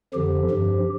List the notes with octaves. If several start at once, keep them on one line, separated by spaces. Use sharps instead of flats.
F2 D3 F3 G4
G2 F3